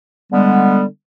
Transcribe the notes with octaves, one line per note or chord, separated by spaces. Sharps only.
D3 G3 G#3 B3